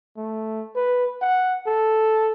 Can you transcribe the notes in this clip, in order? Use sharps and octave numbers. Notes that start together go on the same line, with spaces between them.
A3
B4
F#5
A4